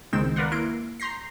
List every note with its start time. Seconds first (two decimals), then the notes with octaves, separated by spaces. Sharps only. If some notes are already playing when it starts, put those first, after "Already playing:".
0.13 C#2 D#3 G#3 C4 G5 E7
0.36 A#4 B4 D5 F5 F#5 C6
0.52 A#3 E4 A#4 C6 D7
1.00 A#5 C6 G6 A#6 C7